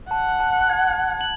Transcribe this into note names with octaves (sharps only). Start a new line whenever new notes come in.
F#5 A5
A5
G#6
F#7